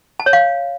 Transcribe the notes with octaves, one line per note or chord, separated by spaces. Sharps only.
A5
C#5
F5